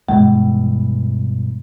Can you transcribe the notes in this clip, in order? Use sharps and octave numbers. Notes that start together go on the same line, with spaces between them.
G2 B2 E3 G#3